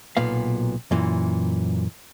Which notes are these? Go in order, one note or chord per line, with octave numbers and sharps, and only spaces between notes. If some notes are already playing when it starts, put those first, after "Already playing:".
B1 A#2 B3 F5
F#2 A#2 E3